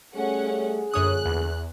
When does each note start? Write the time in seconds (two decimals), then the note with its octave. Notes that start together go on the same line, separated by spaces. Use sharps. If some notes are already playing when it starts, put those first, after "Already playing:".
0.15 G3 A3 C#4 G#4 F#5
0.94 A#1 F#2 D3 C#5 D#6 F#6
1.25 E2